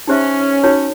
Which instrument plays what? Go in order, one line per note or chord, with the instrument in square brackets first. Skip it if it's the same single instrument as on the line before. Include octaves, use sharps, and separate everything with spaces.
[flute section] C#4 [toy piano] D#4 G4 C5 E5
[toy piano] D#4 F#4 A#4 C#5